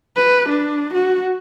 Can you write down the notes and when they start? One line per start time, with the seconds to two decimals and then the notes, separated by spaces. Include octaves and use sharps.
0.16 B4
0.49 D4
0.94 F#4